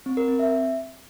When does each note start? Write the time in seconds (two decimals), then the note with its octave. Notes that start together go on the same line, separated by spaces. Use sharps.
0.06 C4
0.17 A#4
0.28 C4
0.39 E5